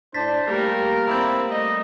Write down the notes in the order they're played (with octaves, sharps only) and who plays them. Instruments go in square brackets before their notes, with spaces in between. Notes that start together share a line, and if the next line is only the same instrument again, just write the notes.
[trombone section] A2 D4 [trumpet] C5 [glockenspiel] A6 B6
[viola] G3 A3 [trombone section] A#3 G4 [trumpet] A#4
[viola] C4 D5 [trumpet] E4 [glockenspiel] A#5 G6
[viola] G3 A3 [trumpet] D#5